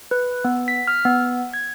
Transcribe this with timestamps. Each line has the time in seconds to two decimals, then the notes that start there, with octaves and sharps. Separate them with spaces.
0.11 B4
0.45 B3
0.68 B6
0.87 F6
1.05 B3
1.54 G#6